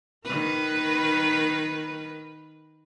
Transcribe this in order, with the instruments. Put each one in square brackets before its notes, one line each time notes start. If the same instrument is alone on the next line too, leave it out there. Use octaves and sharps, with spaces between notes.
[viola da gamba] D#3 A#4 B4